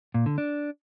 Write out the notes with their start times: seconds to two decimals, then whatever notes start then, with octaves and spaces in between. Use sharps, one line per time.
0.14 A#2
0.26 D3
0.38 D4